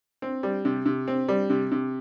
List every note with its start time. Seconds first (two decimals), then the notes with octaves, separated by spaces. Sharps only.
0.22 C4
0.43 G3
0.65 C3
0.86 C3
1.08 C4
1.29 G3
1.50 C3
1.71 C3